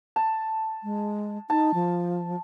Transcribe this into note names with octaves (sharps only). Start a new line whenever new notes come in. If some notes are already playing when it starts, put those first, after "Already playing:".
A5
G#3
D#4 A5
F3